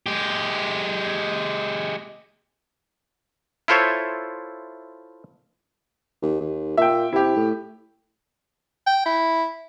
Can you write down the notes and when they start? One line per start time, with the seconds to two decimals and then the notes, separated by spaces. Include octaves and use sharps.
0.06 G#3 G4
3.68 E4 F4 A4 C5 C#5 E5
6.22 D#2
6.41 D#2
6.77 A#2 E5 G5
7.13 C3 E4 G4
7.37 A2
8.87 G5
9.06 E4